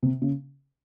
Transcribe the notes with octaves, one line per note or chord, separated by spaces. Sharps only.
C3
C#3